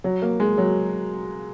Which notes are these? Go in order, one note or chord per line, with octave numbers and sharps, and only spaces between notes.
F#3
A#3
G#3
F#3